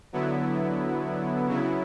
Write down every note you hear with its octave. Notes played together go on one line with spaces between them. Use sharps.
D3 F#3 B3 E4
C#3 F#3 B3 E4